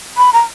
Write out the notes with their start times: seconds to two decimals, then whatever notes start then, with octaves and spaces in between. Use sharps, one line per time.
0.17 B5
0.33 A#5